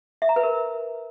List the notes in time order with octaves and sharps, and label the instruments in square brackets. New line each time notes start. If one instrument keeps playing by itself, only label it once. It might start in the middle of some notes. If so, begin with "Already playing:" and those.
[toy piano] E5
A#5
B4
A#4